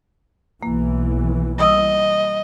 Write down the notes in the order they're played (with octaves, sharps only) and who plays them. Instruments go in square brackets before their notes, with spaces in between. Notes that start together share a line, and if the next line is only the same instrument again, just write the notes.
[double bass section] B1 E3 [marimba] A#3
[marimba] G3 D#6 E6 [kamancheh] D#5